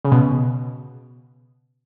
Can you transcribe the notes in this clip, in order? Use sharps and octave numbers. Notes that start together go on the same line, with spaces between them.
C#3
B2